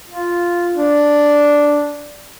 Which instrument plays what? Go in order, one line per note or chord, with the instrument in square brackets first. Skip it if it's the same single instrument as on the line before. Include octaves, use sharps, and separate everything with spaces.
[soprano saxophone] F4
D4